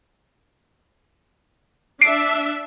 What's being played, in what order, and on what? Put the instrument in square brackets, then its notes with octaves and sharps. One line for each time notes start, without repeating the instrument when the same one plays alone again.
[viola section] D4 E5 [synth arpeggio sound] C7 D7